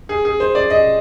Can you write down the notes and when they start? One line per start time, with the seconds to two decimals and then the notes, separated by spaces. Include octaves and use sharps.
0.09 G#4
0.25 G#4
0.40 C5
0.55 D5
0.70 D#5